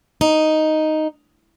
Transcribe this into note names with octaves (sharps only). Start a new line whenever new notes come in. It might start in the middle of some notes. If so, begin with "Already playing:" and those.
D#4